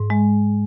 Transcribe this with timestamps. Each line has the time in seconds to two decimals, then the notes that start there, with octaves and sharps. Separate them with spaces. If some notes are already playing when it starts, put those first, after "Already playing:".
Already playing: G#2
0.10 G#3